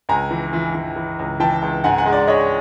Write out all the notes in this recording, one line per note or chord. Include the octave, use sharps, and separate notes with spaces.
C#2 G#5 A#5
E3
E3
E3
E3
C#2
E3 G5 A5
C#2
G#2 F#5 G#5
F#5 G#5
G#3
D5
G#3 C#5 D#5